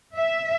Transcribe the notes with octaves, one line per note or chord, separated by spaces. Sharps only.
E5